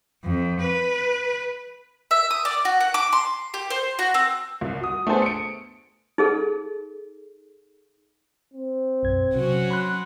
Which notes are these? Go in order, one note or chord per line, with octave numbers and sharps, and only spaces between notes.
F2
B4
E5
D#6
D5
F#4
F#5
D6
C6
G4
C5
F#4
C4
C2
F#4 D#6
A3 B3 D4 G#4 C5 A5
C#7 D7
D#4 G#4 A4
C4
B1 F#2 G#6
C3 F#3 C#4 F#4
B5 C6 F#6